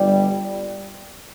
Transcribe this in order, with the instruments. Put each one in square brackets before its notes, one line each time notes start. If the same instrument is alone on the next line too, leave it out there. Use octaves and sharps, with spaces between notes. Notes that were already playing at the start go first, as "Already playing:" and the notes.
Already playing: [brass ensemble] G1 G3